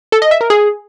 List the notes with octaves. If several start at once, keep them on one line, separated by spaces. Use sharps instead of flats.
A4
D#5
E5
A#4
G#4